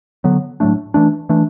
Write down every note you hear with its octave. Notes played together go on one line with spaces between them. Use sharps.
D3 F#3 B3
A2 F#3 A3 D4
E3 A3 D4
E3 A3 D4